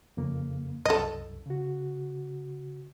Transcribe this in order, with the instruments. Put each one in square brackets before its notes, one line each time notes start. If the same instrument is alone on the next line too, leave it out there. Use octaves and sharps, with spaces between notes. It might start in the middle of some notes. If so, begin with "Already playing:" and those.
[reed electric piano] F2 C#3 A#3
[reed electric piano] C2 F#2 [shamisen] A4 D#5
[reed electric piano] C#3 F#4